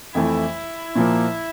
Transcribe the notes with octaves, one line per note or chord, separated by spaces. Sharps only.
F2 E3 A3 E4
A#2 F3 A#3